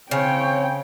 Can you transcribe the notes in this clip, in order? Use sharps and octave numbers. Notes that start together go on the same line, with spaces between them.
C#3 C4 C#5 G5